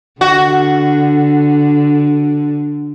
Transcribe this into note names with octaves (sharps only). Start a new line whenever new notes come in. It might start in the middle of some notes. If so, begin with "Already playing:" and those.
D3 F#4